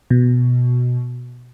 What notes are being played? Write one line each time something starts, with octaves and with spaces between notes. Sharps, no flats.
B2